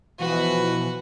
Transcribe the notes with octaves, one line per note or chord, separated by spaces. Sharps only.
B2 E3 F3 F#4 B4